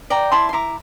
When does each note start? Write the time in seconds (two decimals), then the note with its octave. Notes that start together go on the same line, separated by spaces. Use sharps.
0.10 D5 G5 A#5
0.32 E4 A5 C6
0.49 C6
0.53 E4 A#5 D6